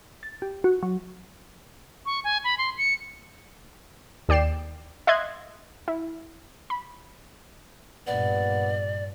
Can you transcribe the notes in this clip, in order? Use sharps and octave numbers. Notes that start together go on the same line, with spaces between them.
A6
G4
F#4
F#3
C#6
G#5
B5
C6
C#7
D#2 D5 G5 C7 E7
D#5 E5 C6 F#6 G#6
E4
B5
G2 A#2 B3 D5